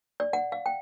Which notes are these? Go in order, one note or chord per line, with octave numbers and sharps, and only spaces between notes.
D5
F#5
F5
G5